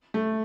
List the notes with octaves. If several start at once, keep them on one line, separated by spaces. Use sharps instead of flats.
A3